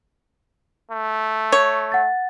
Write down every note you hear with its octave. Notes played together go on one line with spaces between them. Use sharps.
A3
C#5
F#5 A6